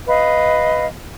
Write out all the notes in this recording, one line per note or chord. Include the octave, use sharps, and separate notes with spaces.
B4 D#5 F5